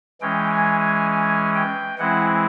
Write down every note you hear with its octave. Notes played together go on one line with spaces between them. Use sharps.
E3 G#3 C#4 G5
G#5
G#5
G#5
G5
E3 G#3 C4 E4 F#5